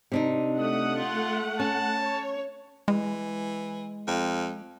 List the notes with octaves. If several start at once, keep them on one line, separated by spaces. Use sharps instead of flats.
C3 D4 D#4
A3 F#5 D#6
F4
C#4 A5
C#5
E3 G#3
F2